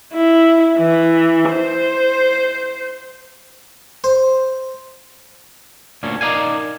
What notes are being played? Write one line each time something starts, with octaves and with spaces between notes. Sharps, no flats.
E4
E3
C5
C5
D2 A#2 D3 C#4
D#4 A#4 D5 F5 G#5